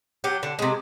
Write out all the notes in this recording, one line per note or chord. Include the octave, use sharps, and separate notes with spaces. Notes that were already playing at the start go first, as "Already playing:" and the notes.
F#3 G4
D3
C3 G#3